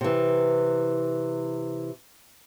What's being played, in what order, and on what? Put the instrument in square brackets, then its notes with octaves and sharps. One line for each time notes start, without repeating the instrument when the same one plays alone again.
[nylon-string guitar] C3 E3